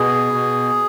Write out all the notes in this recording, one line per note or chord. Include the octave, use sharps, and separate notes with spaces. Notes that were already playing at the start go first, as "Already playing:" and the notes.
Already playing: B2 G#4
B2